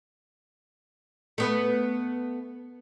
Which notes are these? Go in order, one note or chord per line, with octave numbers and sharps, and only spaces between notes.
A3 B3 B4